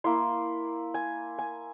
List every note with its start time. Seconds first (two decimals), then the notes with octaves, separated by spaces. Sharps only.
0.04 A#3 E4 C6
0.94 G#5
1.39 G#5